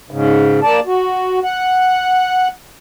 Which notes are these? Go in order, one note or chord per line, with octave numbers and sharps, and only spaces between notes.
G#2 C#3
A#3 D5 A5
F#4
F#5